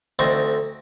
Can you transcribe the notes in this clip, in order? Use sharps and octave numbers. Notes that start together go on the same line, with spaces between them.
D2 C4 D#4 A4 C#6